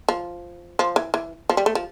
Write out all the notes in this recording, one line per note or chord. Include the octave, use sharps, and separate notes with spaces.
F3
F3
E3
E3
F3
G3
A3
F3